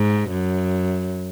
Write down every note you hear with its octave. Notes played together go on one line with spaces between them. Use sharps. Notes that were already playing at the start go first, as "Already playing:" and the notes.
Already playing: G#2
F#2